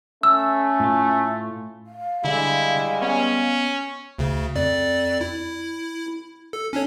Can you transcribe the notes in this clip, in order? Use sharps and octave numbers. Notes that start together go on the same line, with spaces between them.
A3 C#4 E6
A2 F4
F5
D3 G3 G#3 E4
B3 C#4
D2 C#3
F2 D5
E4
A4
C#4 D4 C#5